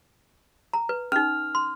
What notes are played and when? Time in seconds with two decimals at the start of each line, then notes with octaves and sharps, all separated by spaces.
0.73 A#5
0.89 B4
1.12 C#4 D#4 F6
1.55 C6